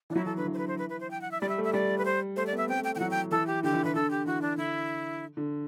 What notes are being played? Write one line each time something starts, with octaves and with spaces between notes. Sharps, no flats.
E3 D4
F#3 E4
E3 A4
D3 B4
E3
C5
B4
C5
B4
B4
C5
G5
F#5
E5
G3 D5
E5
A3
E5
G3 D5
B4
C5
A3 C5
D5
B3
E5
C4 G5
A3
G5
E3 G5
F#3 F#5
G5
E3 A4
G4
D3 G4
E3
E3 B4
D3 A4
G4
E3 F#4
D4
D3 E4
D3